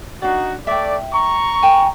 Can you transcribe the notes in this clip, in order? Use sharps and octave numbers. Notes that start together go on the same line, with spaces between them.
D4 D#4 F#4 D5
A3 D5 E5 G5
A#5 C#6
G5 G#5